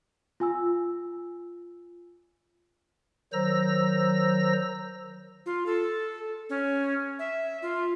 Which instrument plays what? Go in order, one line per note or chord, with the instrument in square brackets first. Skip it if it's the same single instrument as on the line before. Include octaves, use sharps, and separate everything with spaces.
[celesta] F4 G#5 E6
[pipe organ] D#3 F#3 C5 A#5 E6 A#6
[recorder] F4
A4
C#4
E5
F4